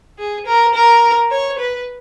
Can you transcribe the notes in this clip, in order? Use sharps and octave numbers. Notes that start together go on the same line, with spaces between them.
G#4
A#4
A#4
C#5
B4